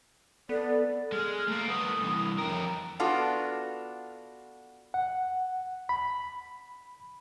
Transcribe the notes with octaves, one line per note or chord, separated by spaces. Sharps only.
B3 A4 D5
G#3 F6
A3 A#3 A#5
A3 B3 D#6
C2 E3
F2 A#4 G5
B3 D4 F4 F#4 A4
F#5
B5